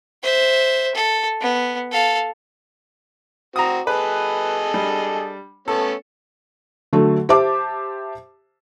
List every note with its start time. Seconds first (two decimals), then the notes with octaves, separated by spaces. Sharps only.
0.23 C5 E5
0.95 A4
1.41 B3
1.91 A4 F5
3.56 C4 F#4 A#5 D#6
3.87 G#4 A4 B4 D#5
4.74 G3 D4
5.68 A3 B3 C#4 A4
6.93 D3 F#3 A3
7.29 G4 C5 E5 A5 D6